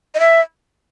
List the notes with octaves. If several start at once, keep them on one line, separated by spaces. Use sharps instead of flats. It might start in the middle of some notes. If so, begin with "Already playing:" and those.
D#5
E5